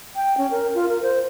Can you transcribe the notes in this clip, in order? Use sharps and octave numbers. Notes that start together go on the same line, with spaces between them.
G5
C#4
A#4
F4
A#4
C5